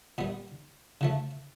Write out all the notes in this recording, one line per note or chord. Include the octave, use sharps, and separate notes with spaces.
A#2 G3 B3
C#3 F3 A3